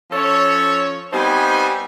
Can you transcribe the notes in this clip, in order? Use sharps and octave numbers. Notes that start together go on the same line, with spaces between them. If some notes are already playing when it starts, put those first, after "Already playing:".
F3 C#4 A4 C#5
G3 B3 C4 D#4 G5 G#5